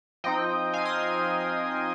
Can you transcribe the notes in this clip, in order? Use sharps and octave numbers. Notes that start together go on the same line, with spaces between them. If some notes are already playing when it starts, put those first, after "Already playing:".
F3 C4 D#4 D#5 G5
F5 G#5
C6 D#6